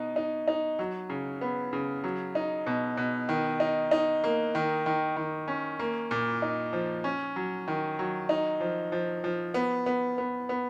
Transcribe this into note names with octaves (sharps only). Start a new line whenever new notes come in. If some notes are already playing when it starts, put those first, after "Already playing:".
Already playing: B2 D#4
D#4
D#4
F#3
C#3
B3
C#3
F#3
D#4
B2
B2
D#3
D#4
D#4
A#3
D#3
D#3
D#3
C#4
A#3
A#2
D#4
F3
C#4
F#3
D#3
F#3
D#4
F3
F3
F3
B3
B3
B3
B3